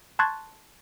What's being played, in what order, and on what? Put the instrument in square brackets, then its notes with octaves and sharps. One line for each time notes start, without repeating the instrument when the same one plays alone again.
[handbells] A5 C6 C#6 F#6 G#6 A6